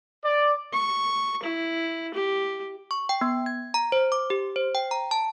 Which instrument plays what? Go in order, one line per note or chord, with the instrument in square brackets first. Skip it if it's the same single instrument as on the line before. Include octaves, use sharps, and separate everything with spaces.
[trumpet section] D5
[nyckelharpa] C#6
E4
G4
[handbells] C#6
G5
B3
G#6
A#5
C5
D6
G4
C5
G5
A#5
A5